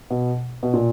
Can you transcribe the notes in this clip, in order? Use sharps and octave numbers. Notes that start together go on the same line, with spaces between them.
B2
B2
A#2